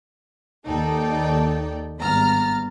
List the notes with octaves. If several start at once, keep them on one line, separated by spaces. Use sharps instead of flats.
D#2 D#4 A4 D5 G5
G#1 E2 G2 A#5 F6 A6